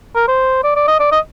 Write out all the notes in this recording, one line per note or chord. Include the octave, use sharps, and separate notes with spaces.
A#4
C5
D5
D5
D#5
D5
D#5